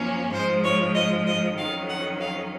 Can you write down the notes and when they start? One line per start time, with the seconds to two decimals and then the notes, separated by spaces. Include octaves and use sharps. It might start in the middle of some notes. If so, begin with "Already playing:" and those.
Already playing: F#2 F3 A#3 C#4
0.32 G#2 F3 G#3 C5
0.63 C#5
0.94 D#5
1.26 D#5
1.57 F2 D#3 F#3 C#4 F5
1.89 F#5
2.20 F5